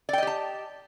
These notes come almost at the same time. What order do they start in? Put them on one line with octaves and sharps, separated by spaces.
D5 G5 D#5 G4 A5